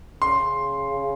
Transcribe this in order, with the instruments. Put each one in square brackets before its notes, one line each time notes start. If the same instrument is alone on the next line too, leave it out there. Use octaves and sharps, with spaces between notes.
[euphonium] C#3 [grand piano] C6